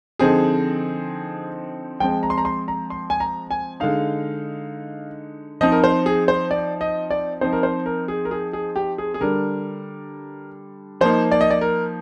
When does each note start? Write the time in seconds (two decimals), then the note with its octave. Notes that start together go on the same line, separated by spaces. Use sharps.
0.19 D3 F3 C4 D#4 G#4
2.00 F3 G#3 C4 G5
2.23 A#5
2.30 C6
2.38 A#5
2.45 C6
2.68 A#5
2.90 C6
3.10 G#5
3.20 A#5
3.51 G#5
3.80 D3 G#3 D#4 F5
5.61 F3 C4 D#4 D#5
5.72 A#4
5.84 C5
6.06 G#4
6.28 C5
6.51 D5
6.81 D#5
7.11 D5
7.41 F3 C4 D#4 C5
7.53 A#4
7.63 C5
7.86 A#4
8.08 G#4
8.25 A#4
8.31 G#4
8.53 G#4
8.76 G4
8.98 G#4
9.14 G#4
9.21 D3 G3 D4 A#4
11.01 F3 A#3 D#4 C5
11.32 D5
11.41 D#5
11.50 D5
11.61 A#4